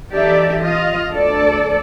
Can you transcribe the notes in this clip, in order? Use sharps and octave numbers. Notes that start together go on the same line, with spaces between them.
E3 D#4 G4 A4 D5 E5
F4 D#5 F5
D2 A4 D5